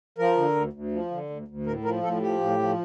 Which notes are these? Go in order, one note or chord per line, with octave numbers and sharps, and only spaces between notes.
F3 A#4
D3
D2
D2
F3
D3
D2
D2
A2 A#4
F3 A#4
A2 A4
F3 G4
A2
F3